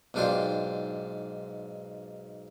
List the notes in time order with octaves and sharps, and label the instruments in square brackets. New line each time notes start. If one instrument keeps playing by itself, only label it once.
[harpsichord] B1 G#2 D4 F4 G5 C6